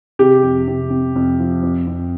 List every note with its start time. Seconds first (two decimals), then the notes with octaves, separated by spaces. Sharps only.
0.19 C3 G4
0.43 F2
0.68 C3
0.90 C3
1.16 F2
1.39 F3
1.63 F2
1.87 F2